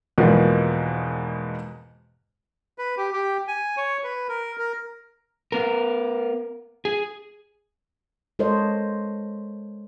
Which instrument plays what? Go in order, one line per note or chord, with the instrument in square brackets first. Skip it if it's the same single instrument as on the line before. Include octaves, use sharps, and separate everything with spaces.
[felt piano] E2 G#2 B2 F3 A#3
[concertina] B4
G4
G4
G#5
C#5
B4
A#4
A#4
[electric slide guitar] B3 A#4
G#4
[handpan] G#3 A4 A#4 C5 C#5 D#5